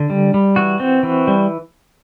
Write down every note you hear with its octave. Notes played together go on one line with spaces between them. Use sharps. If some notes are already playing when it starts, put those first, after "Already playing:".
Already playing: D3
G3
G3
E3 F#4
C4
E3
G3